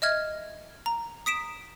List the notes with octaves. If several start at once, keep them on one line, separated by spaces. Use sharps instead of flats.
D#5 E5 F6 G#6
A#5
D#6 B6 D7 E7